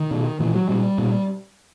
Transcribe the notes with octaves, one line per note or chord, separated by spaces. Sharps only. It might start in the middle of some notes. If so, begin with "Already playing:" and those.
Already playing: D#3
B2
A#2 E3
F#3
A#2 G3
A#2